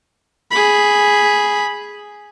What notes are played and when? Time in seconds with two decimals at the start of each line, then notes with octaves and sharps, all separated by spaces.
0.51 G#4 B5